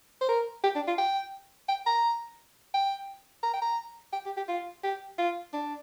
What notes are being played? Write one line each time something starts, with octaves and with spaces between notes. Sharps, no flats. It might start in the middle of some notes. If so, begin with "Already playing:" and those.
C5
A#4
G4
D4
F4
G5
G5
A#5
G5
A#5
G5
A#5
G5
G4
G4
F4
G4
F4
D4